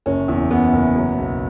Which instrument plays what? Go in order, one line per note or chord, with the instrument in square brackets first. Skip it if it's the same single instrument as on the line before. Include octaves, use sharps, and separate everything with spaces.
[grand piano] F#1 C#4
E2
F#1 B3
F#1
F#3
B1